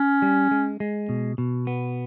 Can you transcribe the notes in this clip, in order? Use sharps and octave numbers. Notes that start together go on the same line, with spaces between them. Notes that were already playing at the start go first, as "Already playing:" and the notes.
Already playing: C#4
G3
G#3
G#3
B2
B2
B3